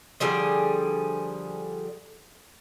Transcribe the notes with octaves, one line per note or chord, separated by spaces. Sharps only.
D3 F3 G3 G#4